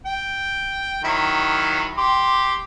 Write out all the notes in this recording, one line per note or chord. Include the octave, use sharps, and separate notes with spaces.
G5
D#3 F#3 E4
G4 C6 D6